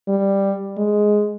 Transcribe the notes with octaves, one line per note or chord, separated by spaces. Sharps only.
G3
G#3